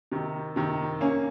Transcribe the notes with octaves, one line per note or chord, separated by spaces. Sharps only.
C3 D#3
C3 D#3
A#3 C#4